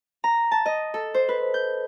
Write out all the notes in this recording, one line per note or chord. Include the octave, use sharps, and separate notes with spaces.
A#5
A5
D#5
A4
C5
B4
G6